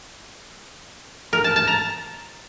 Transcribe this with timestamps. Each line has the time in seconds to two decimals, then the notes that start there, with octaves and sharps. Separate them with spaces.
1.33 A#4
1.44 A5
1.56 A5
1.67 A#5